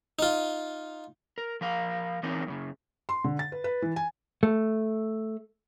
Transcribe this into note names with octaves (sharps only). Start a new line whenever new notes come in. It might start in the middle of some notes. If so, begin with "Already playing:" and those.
D#4 F4
A#4
F3 A#4 F5
E3 C4 C#4 D#4 A#4
F#2 A2 C#3
C6
D3
A6
B4
B4
E3
G#5
A3